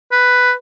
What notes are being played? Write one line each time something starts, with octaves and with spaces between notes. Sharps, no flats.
B4